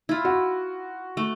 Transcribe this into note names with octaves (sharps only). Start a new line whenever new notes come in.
E4 F4
F#4
A3